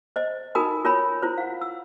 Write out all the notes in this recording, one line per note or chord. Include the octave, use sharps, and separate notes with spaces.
C5 D#5
D#4 F#4 A#4 G#5 B5 D#6
F4 A#4 C#5 G#5 B5
E4 F4 C5
F5 F#5
E6